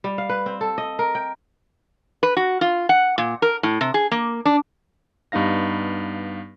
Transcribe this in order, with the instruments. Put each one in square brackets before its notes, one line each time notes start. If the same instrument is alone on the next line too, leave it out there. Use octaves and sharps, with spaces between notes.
[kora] G3
F5
B4
C4
A4
D#5
A#4
G5
[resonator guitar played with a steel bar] B4
F#4
F4
F#5
A#2
A#4
A2
C3
G#4
A#3
D4
[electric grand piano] G2 B3 D#4 F5 A#6